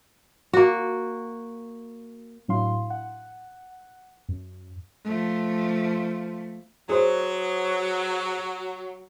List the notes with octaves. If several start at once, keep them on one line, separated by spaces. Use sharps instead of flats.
A#3 F#4
A2 F#3 D4 E4 F5 C6
F#5
F#2
F3 A3
F#3 G#4 C5